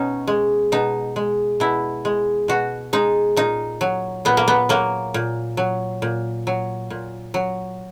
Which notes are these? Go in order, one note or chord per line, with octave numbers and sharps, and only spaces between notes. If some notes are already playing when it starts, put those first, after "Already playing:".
Already playing: B2 C#4 D#4
G#3
B2 D#4
G#3
B2 E4
G#3
B2 F#4
G#3 D#4
A#2 D#4
F#3
A#2 B3
A#3
B3
F#3 A#3
A#2
F#3
A#2
F#3
A#2
F#3